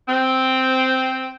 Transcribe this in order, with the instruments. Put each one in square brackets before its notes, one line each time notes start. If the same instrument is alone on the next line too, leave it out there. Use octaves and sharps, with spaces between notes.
[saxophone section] C4